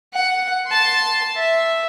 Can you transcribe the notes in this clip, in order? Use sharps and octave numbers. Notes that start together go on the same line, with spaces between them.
F#5
A5 C6
E5